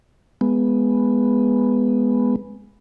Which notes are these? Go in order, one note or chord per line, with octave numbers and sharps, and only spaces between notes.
G#3 B3